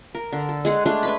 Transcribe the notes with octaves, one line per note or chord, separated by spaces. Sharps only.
A#4
D3
A4
G#3 G#4 F#5
G#3 A3 D4 G#4
D4 B4 B5